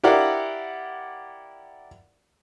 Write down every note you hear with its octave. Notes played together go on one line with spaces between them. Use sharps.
E4 G4 A#4 D5 F5 F#5